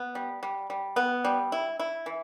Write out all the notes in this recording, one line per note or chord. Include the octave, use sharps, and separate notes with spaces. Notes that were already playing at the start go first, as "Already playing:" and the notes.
Already playing: B3
G3
G3
G3
B3
G3
E4
E4
E3